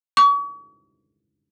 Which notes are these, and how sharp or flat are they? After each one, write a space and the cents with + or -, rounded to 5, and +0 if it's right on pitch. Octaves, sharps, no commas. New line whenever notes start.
C#6 +40